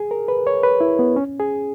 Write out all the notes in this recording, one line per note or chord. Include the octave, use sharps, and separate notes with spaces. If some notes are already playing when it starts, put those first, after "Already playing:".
Already playing: G#4
A#4
B4
C#5
B4
E4
B3
C#4
G#4